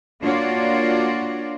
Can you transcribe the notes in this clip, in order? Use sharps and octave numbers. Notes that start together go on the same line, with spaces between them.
A#3 D4 F4 F#4 C#5 D5